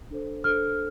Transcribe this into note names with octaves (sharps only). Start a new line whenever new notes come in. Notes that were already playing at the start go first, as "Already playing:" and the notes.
D4 A4 C5
D4 A4 C5 F6